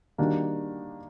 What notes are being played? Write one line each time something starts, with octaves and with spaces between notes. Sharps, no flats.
D#3 G3 A#3 D4 F#4